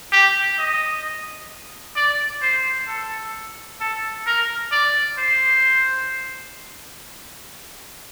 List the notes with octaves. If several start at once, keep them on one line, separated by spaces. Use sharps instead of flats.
G4
D#5
D5
C5
A4
A4
A#4
D5
C5